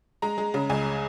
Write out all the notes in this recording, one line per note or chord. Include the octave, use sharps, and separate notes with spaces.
G#3 A#5
G#3
C#3
C#2 G#5